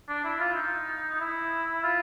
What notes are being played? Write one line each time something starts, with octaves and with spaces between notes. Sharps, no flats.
D4
E4
F4
D#4
D#4
E4
F4